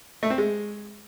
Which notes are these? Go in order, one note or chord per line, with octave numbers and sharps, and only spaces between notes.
A3
C4
G#3